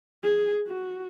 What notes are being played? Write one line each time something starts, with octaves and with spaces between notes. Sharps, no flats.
G#4
F#4